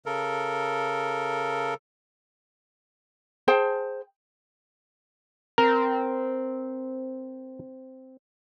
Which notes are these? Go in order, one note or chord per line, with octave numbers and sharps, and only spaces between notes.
C#3 A4 A#4
G#4 C5 G5 A5
C4 A#4